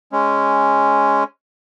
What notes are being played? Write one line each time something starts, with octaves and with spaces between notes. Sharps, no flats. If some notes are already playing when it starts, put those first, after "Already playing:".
G#3 C#4